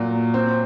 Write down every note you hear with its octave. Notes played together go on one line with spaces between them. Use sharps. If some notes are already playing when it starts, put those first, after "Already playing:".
Already playing: A#2 F#3
C4